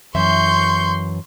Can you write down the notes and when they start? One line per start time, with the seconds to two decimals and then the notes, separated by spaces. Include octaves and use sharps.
0.15 F#2 E3 E5 C6 C#6 G6